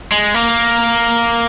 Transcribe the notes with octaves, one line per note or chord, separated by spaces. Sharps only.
G#3
A#3